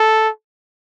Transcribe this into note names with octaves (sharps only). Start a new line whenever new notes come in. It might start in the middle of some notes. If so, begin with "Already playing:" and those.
Already playing: A4